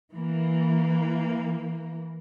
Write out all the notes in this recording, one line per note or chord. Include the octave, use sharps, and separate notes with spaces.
E3 A#3